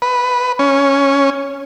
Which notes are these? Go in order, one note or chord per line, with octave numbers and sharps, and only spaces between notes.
B4
C#4